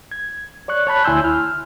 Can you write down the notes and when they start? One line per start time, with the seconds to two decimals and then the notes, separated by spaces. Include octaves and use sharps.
0.11 G#6
0.68 C#5 D5 C#6 F#6
0.87 C#5 A5 B5 F#6
1.04 D2 E4 G#5 C6 E6 G6
1.24 F6